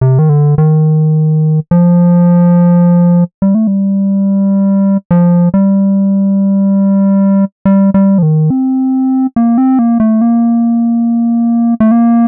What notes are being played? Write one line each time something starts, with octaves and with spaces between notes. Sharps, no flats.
C3
D#3
D3
D#3
F3
G3
A3
G3
F3
G3
G3
G3
F3
D#3
C4
A#3
C4
A#3
A3
A#3
A3
A#3